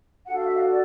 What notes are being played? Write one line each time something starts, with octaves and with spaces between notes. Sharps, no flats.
D4 F#4 A4 F#5
F5
E5
D#5 F5
D5